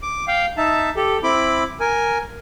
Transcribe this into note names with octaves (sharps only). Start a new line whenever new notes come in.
D6
F5 G5
D#4 E5 A5
G4 A4
C4 E4 B5 D6
A#4 G#5